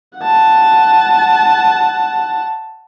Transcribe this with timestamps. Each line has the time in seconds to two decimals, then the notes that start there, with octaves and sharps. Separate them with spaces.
0.19 F#5 A5